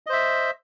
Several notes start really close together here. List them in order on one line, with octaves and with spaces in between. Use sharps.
D#5 C5 E5